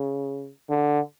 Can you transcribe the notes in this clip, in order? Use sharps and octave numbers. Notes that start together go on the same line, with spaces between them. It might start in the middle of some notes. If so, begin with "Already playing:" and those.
Already playing: C#3
D3